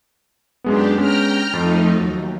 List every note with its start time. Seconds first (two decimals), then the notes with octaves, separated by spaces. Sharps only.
0.64 F#2 G#3 B3 D4 G4
0.98 G#3 B3 C#4 G5 A#5 F6
1.53 F2 F3 A3 D#4 A6
1.97 D#2 F#3